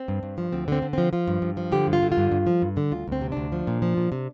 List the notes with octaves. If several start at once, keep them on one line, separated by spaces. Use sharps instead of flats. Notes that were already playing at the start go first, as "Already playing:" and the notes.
Already playing: C4
G2
G2
F3
D2 C4
D3 C4
D3
F3 C4
F3 F4
G2
G2
F3
D3 G4
G2
F4
D3
F4
G2
G2
F3
G2
D3
D2 F4
D2 C4
C3
D2 D4
F3
A#2
F3
A#2
C3